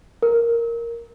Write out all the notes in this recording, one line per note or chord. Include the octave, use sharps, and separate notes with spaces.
A#4